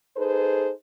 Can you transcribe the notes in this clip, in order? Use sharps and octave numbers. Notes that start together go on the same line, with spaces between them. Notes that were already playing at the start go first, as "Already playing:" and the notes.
D#4 G#4 A4 B4 C5